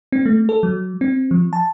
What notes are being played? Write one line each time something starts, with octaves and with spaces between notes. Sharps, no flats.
C4
A3
A4
F#3
C4
F3
A5